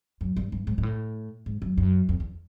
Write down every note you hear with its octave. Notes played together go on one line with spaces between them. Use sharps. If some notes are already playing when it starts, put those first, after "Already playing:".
F#2
G2
G2
G#2
G#2
A2
G#2
F#2
F#2
F2
E2